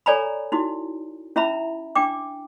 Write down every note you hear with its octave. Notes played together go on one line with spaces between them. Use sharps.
A4 C#5 D5 G#5 A#5 B5
D#4 E4 F#4
C#4 E4 E5 A#5 B5
D4 G5 D6